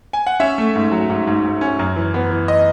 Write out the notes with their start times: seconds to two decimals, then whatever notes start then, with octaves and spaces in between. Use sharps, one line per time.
0.13 G#5
0.27 F#5
0.40 C#4 E5
0.58 A3
0.75 G#2
0.92 F#3
1.10 G#2
1.27 G#2
1.44 G#2
1.61 C#4
1.79 F#2
1.96 E3
2.14 B3
2.31 E3
2.48 D#5